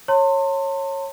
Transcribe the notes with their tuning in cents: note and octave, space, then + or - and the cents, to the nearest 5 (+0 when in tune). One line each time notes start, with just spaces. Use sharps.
C#5 -20 A5 +45 C6 +20